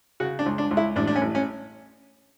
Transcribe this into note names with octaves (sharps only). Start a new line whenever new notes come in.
C#3 F#4
D4
C#2
D4
C#2
E4
A1 D4
D4
C#4
A1
C#4